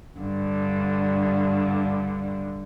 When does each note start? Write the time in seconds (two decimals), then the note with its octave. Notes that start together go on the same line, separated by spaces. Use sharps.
0.19 G2 D3